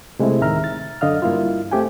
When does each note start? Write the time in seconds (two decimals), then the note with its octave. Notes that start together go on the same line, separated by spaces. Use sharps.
0.19 C3 G#3 A3 C4 E4
0.41 D2 A2 D#3 E5 A#5 F6
0.64 A6
1.01 F#2 D3 D#5 F5 F6
1.22 G2 A#3 E4 F4
1.71 A3 C4 G4 G5 G#5